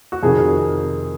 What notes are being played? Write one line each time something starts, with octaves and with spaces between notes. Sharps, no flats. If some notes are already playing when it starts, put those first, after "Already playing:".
F#4
F2 C3 D#3 G#4